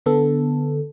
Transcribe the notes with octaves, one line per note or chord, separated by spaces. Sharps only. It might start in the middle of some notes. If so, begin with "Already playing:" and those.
D3 B3 A4